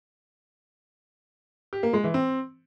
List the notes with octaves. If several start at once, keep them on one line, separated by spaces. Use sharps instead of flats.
G4
A#3
G#3
E3
C4